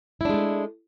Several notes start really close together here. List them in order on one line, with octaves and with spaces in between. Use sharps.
E4 D4 G#3 A3